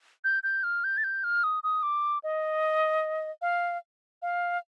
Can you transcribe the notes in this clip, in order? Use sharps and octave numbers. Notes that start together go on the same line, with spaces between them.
G6
G6
F6
G6
A6
G6
F6
D#6
D#6
D6
D#5
F5
F5